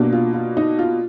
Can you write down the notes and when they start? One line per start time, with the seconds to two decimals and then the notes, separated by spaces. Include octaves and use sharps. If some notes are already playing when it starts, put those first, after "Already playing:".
Already playing: B2 A#3 D4
0.13 F4
0.34 F4
0.57 D#4
0.79 F4